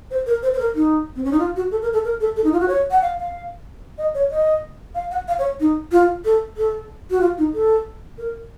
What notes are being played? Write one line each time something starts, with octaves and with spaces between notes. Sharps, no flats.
C5
A#4
C5
C5
A#4
D#4
C4
C#4
D#4
F4
F#4
A4
A#4
A4
A#4
A4
A4
D#4
F4
F#4
C#5
F#5
F5
F5
D#5
C#5
D#5
F5
F#5
F5
C#5
D#4
F4
A4
A4
F#4
F4
D#4
A4
A#4